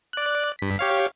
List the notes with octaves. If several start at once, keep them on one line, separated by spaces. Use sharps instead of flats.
D5 F#6
G2 B6
G4 C#5 F5